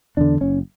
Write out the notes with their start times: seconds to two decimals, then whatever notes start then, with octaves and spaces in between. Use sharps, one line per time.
0.17 E2 D3 D4
0.41 F#1 C#4